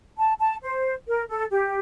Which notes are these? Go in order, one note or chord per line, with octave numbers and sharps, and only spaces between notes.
A5
A5
C5
A#4
A4
G4